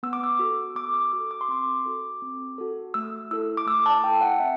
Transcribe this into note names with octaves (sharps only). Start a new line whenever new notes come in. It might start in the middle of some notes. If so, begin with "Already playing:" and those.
B3 E6
D6
E6
F#4 A4
B3 D6
E6
F#4 A4 D6
D6
C6
C4 D6
F#4 A4
C4
F#4 A4
A3 E6
E4 A4 E6
D6
A3 E6
A5
E4 A4 G5
F#5
C4 E5